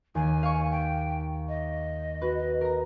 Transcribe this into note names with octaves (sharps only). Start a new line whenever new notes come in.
D#2 G#5
F5 C#6
G5
D#5
F#4 B4
A#4 A#5